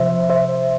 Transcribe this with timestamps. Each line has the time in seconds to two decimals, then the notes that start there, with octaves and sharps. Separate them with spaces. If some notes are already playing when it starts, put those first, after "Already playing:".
Already playing: C3 F3 C5 E5
0.30 C5 E5